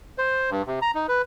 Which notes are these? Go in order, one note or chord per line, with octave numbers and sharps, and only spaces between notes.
C5
G2
C3
A#5
D#4
B4